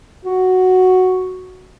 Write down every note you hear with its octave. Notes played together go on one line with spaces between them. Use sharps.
F#4